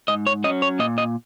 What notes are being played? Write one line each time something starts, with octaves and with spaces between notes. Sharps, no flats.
G#2 D#5
C#5
F#3 C#4 D#5
C#5
A#2 D#5
D#5